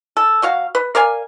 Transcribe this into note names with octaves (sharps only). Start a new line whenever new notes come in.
A4
F#3 F#4 F5
B4
A#4 D5 F5 G#5